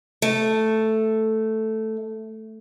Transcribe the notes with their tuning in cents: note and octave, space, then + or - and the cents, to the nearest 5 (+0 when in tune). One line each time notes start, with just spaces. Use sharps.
A3 +0